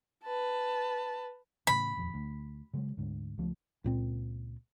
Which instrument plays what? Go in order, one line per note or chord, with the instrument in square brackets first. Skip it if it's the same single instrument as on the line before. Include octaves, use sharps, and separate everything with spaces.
[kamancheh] B4 A5
[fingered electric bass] A2 C#3 E3 [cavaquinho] B5
[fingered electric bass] D#1 F2
D2
C#3 F#3 G#3
D2 G#2 D3
C#2 F3 A3
[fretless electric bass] C#2 A#2 C4